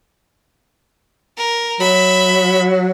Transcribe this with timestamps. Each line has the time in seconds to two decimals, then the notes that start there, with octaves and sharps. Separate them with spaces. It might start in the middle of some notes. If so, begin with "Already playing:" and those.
1.37 A#4
1.80 F#3 E5 B5